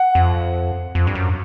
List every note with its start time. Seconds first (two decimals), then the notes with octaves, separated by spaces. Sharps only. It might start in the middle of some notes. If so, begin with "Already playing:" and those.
Already playing: F#5
0.15 F2
0.95 F2
1.07 G2
1.15 F#2